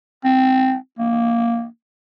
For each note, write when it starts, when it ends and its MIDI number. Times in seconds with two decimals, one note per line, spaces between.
0.24 0.75 60
0.99 1.66 58